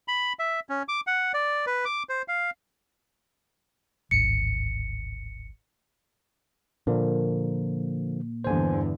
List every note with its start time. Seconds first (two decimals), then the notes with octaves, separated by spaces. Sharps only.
0.08 B5
0.39 E5
0.69 C#4
0.88 D6
1.07 F#5
1.34 D5
1.66 B4
1.85 D6
2.09 C5
2.28 F5
4.11 D1 G#1 C#7
6.87 A#2 D3 F3 A#3
8.44 E2 G2 D3 C5 G#5